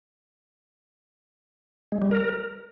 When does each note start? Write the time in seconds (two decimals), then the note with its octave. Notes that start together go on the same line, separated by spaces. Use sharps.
1.92 G#3
2.02 G3
2.11 A#4